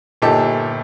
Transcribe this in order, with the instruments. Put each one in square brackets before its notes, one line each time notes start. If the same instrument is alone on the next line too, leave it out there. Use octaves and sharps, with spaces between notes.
[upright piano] G1 A#2 D#4 G4 A4 A5